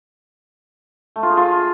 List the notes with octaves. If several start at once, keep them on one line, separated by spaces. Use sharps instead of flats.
A3
F4
G#4
F4